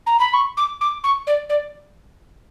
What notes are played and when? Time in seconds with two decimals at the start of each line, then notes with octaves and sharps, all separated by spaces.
0.06 A#5
0.20 B5
0.34 C#6
0.57 D6
0.81 D6
1.04 C#6
1.27 D5
1.49 D5